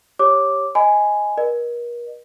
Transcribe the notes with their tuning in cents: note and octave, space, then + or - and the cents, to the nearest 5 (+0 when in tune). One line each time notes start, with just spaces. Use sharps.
G4 +0 C#5 -10 D6 +0
D#5 +0 G#5 +0 B5 +35
A#4 +40 D#5 -25